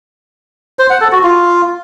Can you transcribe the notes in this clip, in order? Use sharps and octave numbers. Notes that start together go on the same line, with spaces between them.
C5
F#5
A4
F#4
F4